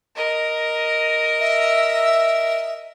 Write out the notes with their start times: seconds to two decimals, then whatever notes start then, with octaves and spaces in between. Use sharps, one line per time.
0.16 A#4 D#5
1.40 E5